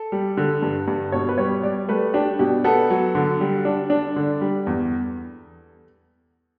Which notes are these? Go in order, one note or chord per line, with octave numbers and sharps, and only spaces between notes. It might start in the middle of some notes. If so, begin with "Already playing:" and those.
Already playing: A4
G3
D3
G2
G2
B2 C#5
B4
G3 C#5
G3 D5
A3 B4
D4 G4
B2 G4
B3 A4
F#3
D3
G3
D4
D4
D3
G3
E2